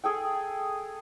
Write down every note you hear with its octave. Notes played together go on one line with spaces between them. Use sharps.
G#4 A4 G5